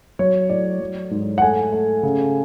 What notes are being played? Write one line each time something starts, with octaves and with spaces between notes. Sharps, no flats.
F#3 C#5
A2 D5
F#3
G#2
F#5
A3 G#5
A3
C#3